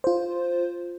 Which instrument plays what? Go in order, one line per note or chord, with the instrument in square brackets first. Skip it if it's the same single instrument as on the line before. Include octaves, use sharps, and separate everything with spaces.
[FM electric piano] F4 C5